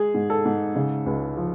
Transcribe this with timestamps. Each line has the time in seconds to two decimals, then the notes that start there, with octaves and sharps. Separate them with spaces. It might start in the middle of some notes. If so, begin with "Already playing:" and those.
Already playing: G#3 G#4
0.14 G#2
0.30 A4
0.45 G#2
0.76 C#3
1.06 C#2
1.37 F3